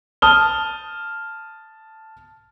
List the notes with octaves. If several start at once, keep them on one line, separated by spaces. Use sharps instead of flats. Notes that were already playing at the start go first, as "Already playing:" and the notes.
A5 D#6 F6 G7